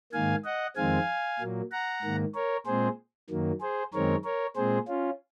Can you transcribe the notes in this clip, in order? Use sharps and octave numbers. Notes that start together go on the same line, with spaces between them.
G#2 D#3 A#3 F5 G#5
D#5 F#5
F2 D#3 G#3 C4 F5 G#5
A#2 F#3 A#3
F#5 A#5
G#2 D#3 A#3
A#4 C#5
A#2 G#3 C4 G#4 C5
F#2 D#3 F#3 A#3
G#4 C5
F#2 D#3 G#3 C4 A#4 C#5
A#4 C#5
A#2 G#3 C4 G#4 C5
C#4 F4